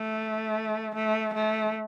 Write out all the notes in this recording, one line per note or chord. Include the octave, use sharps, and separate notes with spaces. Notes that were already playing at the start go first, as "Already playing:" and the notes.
Already playing: A3
A3
A3